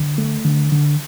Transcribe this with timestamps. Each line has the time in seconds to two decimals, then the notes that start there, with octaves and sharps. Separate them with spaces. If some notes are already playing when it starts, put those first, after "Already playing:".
Already playing: D3
0.18 A3
0.45 D3
0.72 D3